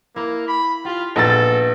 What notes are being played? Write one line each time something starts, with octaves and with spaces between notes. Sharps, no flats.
A#3 E4
B5
F4 G4
A#1 B3 D#4 A4 F5 A6